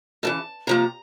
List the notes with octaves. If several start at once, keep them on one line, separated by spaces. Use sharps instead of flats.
F#2 C#3 E3 A5
C3 F3 A#3 A#5